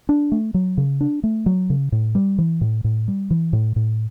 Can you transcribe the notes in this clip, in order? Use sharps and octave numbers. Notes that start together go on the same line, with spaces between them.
D4
A3
F#3
C#3
D4
A3
F#3
C#3
A2
G3
E3
A2
A2
G3
E3
A2
A2